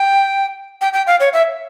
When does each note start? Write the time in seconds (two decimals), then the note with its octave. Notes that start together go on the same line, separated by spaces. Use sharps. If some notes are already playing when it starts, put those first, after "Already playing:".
Already playing: G5
0.81 G5
0.93 G5
1.07 F5
1.20 C#5
1.33 E5